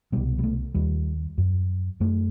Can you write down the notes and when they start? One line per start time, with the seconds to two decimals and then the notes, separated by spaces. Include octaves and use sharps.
0.12 C2 B2 G3
0.39 G3
0.43 A3
0.75 D#2 G3
1.38 F#2
2.00 F#2 A3